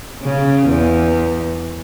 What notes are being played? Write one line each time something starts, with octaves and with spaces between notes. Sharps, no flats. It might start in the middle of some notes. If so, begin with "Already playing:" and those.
C#3
E2